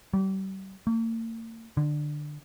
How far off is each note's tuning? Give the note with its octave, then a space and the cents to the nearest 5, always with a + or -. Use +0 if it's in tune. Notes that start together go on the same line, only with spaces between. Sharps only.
G3 -35
A#3 -45
D3 +20